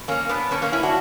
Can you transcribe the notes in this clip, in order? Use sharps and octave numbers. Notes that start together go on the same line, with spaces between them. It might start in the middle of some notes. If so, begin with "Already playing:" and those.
Already playing: B2
A#3 C#4
B3 D4
B2 A#3 C#4
A#3 C#4
C#4 E4
D4 F#4